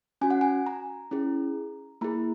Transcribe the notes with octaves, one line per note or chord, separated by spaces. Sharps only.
C#4 F#4 G#5
F#5
G#5
A#5
C#4 E4 G#4
A#3 E4 G#4 A#5